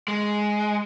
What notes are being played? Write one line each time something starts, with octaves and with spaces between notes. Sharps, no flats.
G#3